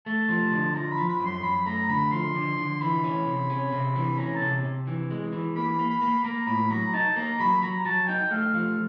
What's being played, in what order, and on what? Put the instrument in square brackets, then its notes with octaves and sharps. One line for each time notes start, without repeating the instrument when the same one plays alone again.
[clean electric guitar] A3 [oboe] A5
[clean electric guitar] F3
D3
[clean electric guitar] F3 [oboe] A#5
[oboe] B5
[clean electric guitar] F3
[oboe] B5
[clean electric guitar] F#2
[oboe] C6
[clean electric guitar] F#2 [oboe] B5
[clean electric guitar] A3 [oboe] A#5
[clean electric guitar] D3 [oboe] B5
[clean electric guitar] F3 [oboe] C6
[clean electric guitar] D3
D3
[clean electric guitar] E3 [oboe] B5
[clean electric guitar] C#4
C3
C#4
C3
E3
[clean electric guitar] C#4 [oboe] A#5
[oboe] A5
[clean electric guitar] C3
C3
E3
G#3
E3
[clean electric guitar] A#3 [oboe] B5
[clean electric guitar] A#3
[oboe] B5
[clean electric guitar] A#3
[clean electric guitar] A#3 [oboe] A#5
[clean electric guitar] A2 [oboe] B5
[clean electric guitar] F#3 [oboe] A#5
[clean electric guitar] D#4 [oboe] A5
[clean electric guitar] A#3 [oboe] A#5
[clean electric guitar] F#3 [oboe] B5
[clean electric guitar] F#3 [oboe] A#5
[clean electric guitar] F#3 [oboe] A5
[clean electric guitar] D#4 [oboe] G5
[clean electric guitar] A3 [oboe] F5
[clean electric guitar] F3 [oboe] F5